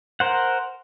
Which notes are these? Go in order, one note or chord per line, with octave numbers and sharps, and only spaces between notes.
A#4 C5 F#5